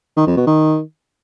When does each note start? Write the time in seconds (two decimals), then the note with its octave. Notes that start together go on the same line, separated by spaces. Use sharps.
0.17 D#3
0.27 F2
0.37 B2
0.47 D#3